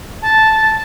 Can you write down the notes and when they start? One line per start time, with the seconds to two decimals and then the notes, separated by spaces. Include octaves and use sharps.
0.22 A5